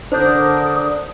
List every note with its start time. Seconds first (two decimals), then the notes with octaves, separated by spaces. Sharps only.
0.12 D3 D4 A#4 C5 D#6 G6